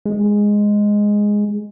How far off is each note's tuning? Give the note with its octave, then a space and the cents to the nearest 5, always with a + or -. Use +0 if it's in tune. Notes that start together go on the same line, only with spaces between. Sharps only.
G#3 -5